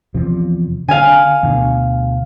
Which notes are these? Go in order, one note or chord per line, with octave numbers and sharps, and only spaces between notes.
E2 C3 F3
D3 F5 G#5
D2 B2 D3